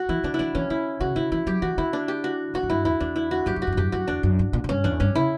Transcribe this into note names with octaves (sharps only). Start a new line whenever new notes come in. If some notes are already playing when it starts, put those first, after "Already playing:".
Already playing: F#4
E3 E4
D3 D4
E4
E3 D4
E3 C#4
D3 E4
C#3 F#4
D3 E4
E3 E4
F#3 G4
E3 F#4
D3 E4
D4
G4
F#4
E3 F#4
F#2
G2 E4
E2 E4
E2 D4
E4
F#4
F#2 G4
F#2
F#4
F#2
G2
F#2 G4
F#2 F#4
E2 D4
F#2
G2
A#2
A#2
G2 C#4
E2 D4
G2 C#4
C#3 E4